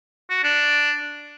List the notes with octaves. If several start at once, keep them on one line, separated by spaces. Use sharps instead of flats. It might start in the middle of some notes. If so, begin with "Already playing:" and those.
F#4
D4